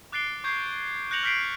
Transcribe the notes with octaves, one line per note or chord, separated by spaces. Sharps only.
D6 F#6 A6 C7 D7 G7
C#6 G6 G#6 C7
F#6 G6 A#6 C#7 F7 F#7
F6 G6 B6 C7 D7